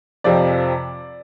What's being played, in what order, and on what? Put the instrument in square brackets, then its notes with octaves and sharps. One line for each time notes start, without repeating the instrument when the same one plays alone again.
[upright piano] F2 C3 F3 D5